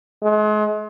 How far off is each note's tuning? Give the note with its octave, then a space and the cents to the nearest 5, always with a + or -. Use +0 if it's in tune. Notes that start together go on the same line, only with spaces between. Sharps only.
G#3 +40